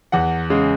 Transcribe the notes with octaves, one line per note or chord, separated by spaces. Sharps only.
E2 F#5
C#3 G#3